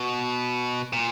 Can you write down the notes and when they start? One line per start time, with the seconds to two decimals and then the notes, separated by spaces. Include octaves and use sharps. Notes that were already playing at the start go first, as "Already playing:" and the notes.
Already playing: B2
0.93 A#2